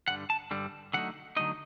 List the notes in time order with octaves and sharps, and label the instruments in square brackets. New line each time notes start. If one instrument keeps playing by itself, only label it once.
[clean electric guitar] G2 D3 G3 F#5
A5
G2 D3 G3
D3 F#3 A3 D#4 F#5
D3 F#3 A3 D#4 D#5